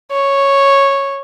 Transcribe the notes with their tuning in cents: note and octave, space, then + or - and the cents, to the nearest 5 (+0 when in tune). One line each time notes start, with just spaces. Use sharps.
C#5 -5